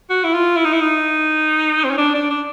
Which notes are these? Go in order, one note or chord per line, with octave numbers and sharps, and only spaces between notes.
F#4
E4
F4
E4
D#4
E4
D#4
C4
C#4
D4
D4
D4